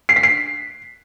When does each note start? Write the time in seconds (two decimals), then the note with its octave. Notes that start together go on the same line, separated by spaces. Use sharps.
0.09 C7
0.16 B6
0.23 C7